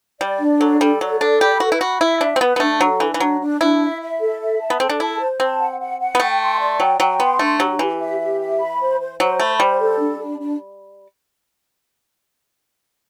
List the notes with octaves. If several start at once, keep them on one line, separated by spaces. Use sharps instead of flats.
G3 D5
D4
F#3 A4
G3 A4
F#3 D5
D4 A4
G4 B5
F#4 B4
E4
F#4 B5
E4 E5
D4 E5
C4
B3 B4
B3
A3 D4
F#3 A4
E3 D4
E3
F#3 D4
D4
D4 E4
E5
E5
A4
E5
A5
B3
C4 A4
D4
E4 A5
C5
C4 A5
F#5
F#5
F#5
B3
A3 G5
C6
D5
F#3 G5
F#3 G5
B3 C6
A3 D4
F#3 G4
E3 G4
E5
G4
E5
B5
C5
C5
F#3 C5
A3 B5
G3 C5
A4
D4
D4
D4